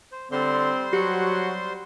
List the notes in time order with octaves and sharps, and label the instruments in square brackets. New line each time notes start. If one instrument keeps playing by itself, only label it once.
[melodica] C5
[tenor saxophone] D3 [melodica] G3 C5 C6 [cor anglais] C4
[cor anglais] F#3 [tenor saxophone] F#4 [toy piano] G4